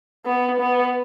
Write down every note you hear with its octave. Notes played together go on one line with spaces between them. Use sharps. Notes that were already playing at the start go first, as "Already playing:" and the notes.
B3
B3